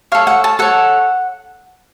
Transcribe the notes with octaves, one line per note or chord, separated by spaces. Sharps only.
A4 C#5 F5
F#5
A5
A4 C#5 F#5